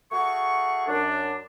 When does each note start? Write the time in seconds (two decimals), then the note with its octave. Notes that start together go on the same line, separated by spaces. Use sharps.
0.11 A3 F#4 G#4 C#6
0.87 F#2 D4